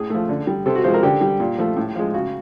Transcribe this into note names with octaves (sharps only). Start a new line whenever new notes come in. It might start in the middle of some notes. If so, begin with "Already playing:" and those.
Already playing: A2 G#4
F3 A3
D3
G3
C3 A4
F#4
F3 G#3 C5
A#4
D3 G4
G3
A#2
F3 A3
A2
F3 G#3
C#3 F#4